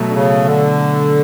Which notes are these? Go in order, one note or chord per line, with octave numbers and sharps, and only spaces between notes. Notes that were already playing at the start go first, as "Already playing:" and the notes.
Already playing: B2 F#3 A3
D3
C#3
D3